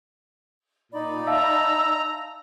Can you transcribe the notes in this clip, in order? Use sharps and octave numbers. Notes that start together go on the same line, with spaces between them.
A#2 D#4 D5 B5
E5 F5 A5 A#5 E6